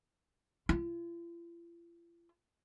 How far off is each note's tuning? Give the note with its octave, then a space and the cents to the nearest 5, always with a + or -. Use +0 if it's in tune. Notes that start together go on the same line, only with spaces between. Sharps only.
F4 -45